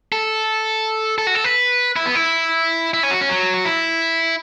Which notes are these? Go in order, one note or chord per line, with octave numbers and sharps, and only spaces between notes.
A4
A4
F#4
A4
B4
E4
B3
E4
E4
C#4
F#4
C#4
F#3
F#4
E4